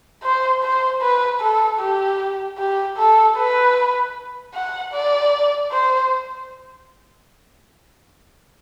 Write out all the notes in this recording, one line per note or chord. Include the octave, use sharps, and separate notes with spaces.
C5
C5
B4
A4
G4
G4
A4
B4
F#5
D5
C5